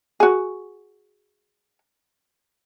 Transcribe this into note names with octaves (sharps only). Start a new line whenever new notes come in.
F#4 G#4